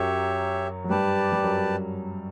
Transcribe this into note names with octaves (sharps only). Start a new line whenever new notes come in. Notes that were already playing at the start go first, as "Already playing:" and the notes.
Already playing: F#2 F#3 G4 C#5 E5
F#3
G2 G3 G4 B4 D5 A5
G3
F#2 F#3